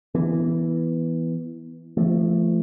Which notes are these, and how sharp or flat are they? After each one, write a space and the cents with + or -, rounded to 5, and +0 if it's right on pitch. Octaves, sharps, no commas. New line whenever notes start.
E3 +0 B3 +0
F3 -30 A3 +0